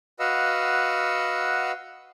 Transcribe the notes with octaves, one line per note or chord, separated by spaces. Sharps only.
F#4 B4 D#5 F5 F#5 E6